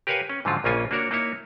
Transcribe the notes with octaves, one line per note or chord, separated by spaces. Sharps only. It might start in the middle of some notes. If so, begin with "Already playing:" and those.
G4 A#4 B4 C#5 F5 G#5
C#4
G#2 D3 F3 F#3 F4
A#1 C#3 A#3 C#4 F4 G#5
A#3 D4 F#4 A#4 C#5
A#3 D#4 E4 C#5